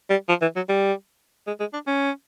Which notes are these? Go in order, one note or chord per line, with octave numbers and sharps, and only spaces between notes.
G3
F3
E3
F#3
G3
G#3
G#3
D4
C#4